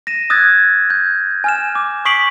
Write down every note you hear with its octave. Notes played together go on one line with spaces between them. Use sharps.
A#6 D#7 E7
D#6 E6 F#6 G#6 A6
G6
G#5 F6 E7
D6
C#6 D#6 B6 C7 D7 F#7